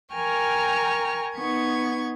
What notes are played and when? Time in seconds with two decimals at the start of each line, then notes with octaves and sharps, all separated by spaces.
0.14 A#4 G5 G#5 A#5 C#6 F6
1.35 B3 D#4 C#6 G#6